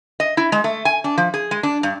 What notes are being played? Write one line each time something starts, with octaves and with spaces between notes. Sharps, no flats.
D#5
E4
G#3
A3
G#5
D4
F3
G#4
G#3
D4
G2